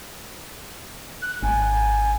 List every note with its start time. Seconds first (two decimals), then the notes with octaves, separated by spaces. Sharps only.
1.22 F#6
1.43 G#1 G#5